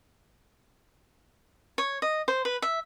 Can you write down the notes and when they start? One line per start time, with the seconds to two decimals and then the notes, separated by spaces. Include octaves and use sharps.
1.78 C#5
2.02 D#5
2.28 C5
2.45 B4
2.62 E5